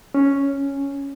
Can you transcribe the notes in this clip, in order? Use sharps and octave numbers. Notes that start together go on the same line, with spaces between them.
C#4